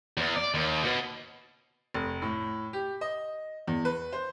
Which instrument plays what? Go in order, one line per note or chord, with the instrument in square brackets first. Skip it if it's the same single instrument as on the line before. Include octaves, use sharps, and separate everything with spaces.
[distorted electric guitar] E2
D5
D#2
B2
[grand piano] F1
A2
G4
D#5
E2
B4
C5